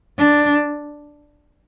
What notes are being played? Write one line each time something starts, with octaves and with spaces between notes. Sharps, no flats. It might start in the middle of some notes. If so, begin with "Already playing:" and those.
D4